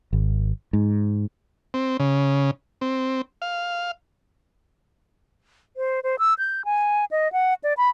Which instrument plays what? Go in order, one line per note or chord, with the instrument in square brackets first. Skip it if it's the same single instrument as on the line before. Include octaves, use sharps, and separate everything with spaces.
[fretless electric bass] G#1
G#2
[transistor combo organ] C4
C#3
C4
F5
[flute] C5
C5
E6
G6
G#5
D#5
F#5
D5
B5